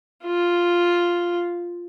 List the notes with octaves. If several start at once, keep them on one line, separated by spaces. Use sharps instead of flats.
F4